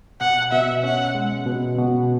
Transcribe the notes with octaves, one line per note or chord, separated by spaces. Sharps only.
B2 F#5
B2 E5
C#4 F#5
G#3
B2
B2